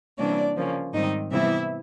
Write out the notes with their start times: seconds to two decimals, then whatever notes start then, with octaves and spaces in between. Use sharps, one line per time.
0.18 C3 E3 G3 A#3 C#4 D4 D5
0.56 C#3 F3 A#3 C#4
0.93 G#2 D#3 G3 C4 D#4 D#5
1.31 C3 E3 G3 B3 E4 E5